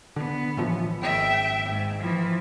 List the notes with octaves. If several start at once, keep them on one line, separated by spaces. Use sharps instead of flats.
D3 B3
A1 E3 F3
G#1 E5 G5
G#2
E3 F3